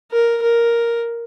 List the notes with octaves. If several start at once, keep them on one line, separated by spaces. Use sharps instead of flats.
A#4
A#4